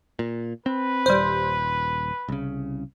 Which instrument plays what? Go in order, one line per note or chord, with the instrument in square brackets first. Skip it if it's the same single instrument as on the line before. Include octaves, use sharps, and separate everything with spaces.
[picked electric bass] A#2
[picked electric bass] C4 [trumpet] B4
[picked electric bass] D#1 [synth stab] G3 C5
[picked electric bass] C2 C#3